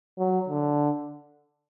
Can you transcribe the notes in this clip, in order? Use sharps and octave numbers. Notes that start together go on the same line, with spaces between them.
F#3
D3